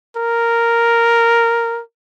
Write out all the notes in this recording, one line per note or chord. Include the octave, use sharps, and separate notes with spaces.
A#4